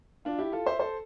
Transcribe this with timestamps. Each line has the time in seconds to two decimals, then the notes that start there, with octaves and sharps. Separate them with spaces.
0.25 D4 F4
0.38 E4 G4
0.52 F4 A4
0.66 C5 E5
0.79 A4 C5